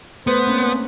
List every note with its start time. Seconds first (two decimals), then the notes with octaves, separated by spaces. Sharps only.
0.27 A3 B3 B4 C5
0.47 A#3 C4 C#4